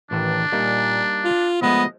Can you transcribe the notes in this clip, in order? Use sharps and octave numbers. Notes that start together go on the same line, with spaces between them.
A1 D#3 E3 D4 A5
A#2 G3 A#3 D#4
F4
F3 G#3 A3 B3 D#5